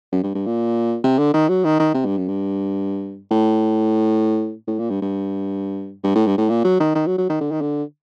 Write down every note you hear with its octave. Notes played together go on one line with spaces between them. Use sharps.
F#2
G2
G2
A#2
C3
D3
D#3
F#3
D#3
D#3
C3
G2
F#2
G2
A2
A2
A#2
G2
G2
G2
A2
G2
A2
A#2
F#3
D#3
D#3
F#3
F#3
D#3
D3
D#3
D3